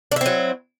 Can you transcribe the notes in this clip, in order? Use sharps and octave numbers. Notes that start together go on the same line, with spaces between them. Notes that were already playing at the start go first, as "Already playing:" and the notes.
F#3 C4 D4 E4